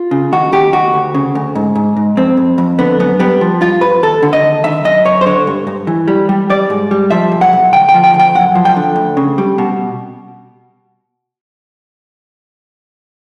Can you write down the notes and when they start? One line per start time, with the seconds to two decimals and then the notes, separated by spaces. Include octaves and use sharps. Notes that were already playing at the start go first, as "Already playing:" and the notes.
Already playing: F4
0.11 C#3
0.32 D#2 F#4
0.52 D#2 G4
0.73 D#2 F#4
0.94 D2
1.14 C#3
1.35 D2
1.55 G#2
1.75 G#2
1.96 G#2
2.17 F2 C4
2.37 F2
2.58 F2
2.79 D3 B3
2.99 F#2 B3
3.20 G3 B3
3.41 F3
3.61 G2 F4
3.81 G2 B4
4.03 D#2 A4
4.22 D3
4.33 D#5
4.44 D#2
4.64 D#3 E5
4.84 F#2 D#5
5.05 F#2 C#5
5.21 C5
5.26 D3 C#5
5.47 G2
5.67 G2
5.87 E3
6.08 G3
6.29 G3
6.50 G3 D5
6.70 G#2
6.91 G3
7.10 F3 E5
7.32 B1
7.41 F#5
7.53 B1
7.72 D2 G5
7.89 G5
7.94 F3
8.04 G5
8.14 D2
8.19 G5
8.35 F#2 F#5
8.55 F3
8.65 G5
8.76 D3
8.96 D2
9.17 C#3
9.38 G3
9.58 B2